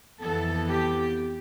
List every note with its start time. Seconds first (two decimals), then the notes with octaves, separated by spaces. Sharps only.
0.20 F2 E3 B3 A4
0.68 G4